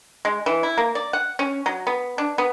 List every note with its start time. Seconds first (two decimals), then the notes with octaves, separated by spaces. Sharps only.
0.25 G#3
0.46 E3
0.63 E4
0.78 A#3
0.95 D5
1.13 F#5
1.39 C#4
1.66 F#3
1.87 B3
2.18 D4
2.38 B3